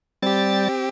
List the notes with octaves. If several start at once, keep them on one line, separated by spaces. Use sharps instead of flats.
G3 C4 G4 A6